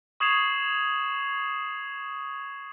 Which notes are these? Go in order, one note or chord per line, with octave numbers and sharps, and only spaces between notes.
C#6 D#6 G#6 C7 E7 F7